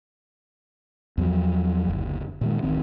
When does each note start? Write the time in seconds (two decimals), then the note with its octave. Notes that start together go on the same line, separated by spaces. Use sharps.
1.18 E2 F3 F#3
1.87 F#1 D2
2.41 A#2 D#3 G#3
2.62 D1 A1 D#3 C4